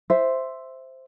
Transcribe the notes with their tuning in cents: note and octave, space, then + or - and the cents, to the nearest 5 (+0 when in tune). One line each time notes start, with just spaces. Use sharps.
C5 +0 E5 +0